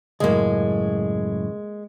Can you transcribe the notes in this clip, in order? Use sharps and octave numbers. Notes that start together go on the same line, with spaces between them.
C#2 F#2 A2 G#3 A#3